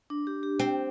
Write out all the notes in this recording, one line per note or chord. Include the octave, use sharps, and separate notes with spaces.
D4
G4
G4
C4